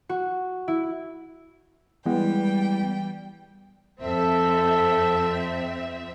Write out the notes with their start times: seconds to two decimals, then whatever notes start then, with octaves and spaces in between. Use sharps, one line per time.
0.09 F#4
0.68 E4
2.06 E3 G3 G#3 B3 G5
4.01 F2 C4 A4 E5